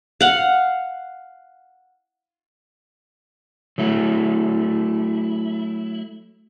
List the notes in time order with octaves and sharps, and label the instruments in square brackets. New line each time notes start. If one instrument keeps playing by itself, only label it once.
[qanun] F5 F#5
[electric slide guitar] F#3 A3 E4